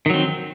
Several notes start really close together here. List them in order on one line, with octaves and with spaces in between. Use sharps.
D#3 F#3 C4